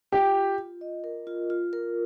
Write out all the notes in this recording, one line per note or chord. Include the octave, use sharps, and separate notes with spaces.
F4 G4
F4
F4
D#5
A#4
F4
F4
A#4